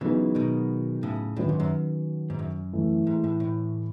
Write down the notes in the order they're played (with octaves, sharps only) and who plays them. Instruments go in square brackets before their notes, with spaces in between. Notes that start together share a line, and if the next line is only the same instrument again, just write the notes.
[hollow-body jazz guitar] C#3 E3 [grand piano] F#3 B3 D#4 G#4 B4
[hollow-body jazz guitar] B2 D#3
A2 C#3
[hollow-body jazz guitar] A2 [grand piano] D#3 F#3 C#4 F#4 B4
[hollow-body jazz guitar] G#2
F#2
G#2
F#2
[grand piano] E3 A3 E4
[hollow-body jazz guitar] G#2
A2
A2